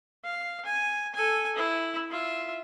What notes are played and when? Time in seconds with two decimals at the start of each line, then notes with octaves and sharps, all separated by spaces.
0.24 F5
0.65 G#5
1.14 A4 G#5
1.56 E4
2.11 F4 E5